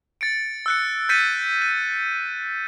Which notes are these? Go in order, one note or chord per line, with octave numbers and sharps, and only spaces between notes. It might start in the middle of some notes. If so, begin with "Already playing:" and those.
A6 C#7 D7
E6 F#6 C#7
G6 A6 B6 C#7 D#7
D#7